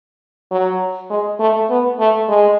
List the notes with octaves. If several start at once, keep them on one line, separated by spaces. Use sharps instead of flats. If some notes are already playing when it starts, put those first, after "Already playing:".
F#3
G#3
A3
B3
A3
G#3